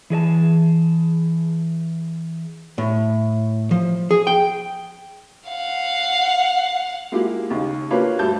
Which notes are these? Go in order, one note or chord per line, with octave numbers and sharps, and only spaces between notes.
E3 G#4 D#5 A5
A2
F3
G#4
G5
F5 F#5
G#3 A#3 E4 F4 G4
D#2 C#3 D#4
A#3 D4 F4 G4 B4 C#5
D2 G2 G3 A5 G6